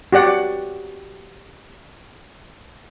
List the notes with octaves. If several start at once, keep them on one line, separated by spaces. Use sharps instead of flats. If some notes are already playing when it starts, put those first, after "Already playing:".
F#4 G4 D5 F#5